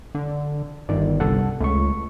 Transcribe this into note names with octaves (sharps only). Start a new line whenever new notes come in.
D3
G1 D#3 D5
C2 A4 F#5
C#2 A3 C#6